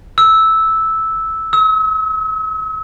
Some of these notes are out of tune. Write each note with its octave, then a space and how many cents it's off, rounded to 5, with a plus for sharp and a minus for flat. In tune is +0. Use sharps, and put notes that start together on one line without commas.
E6 -10
E6 -45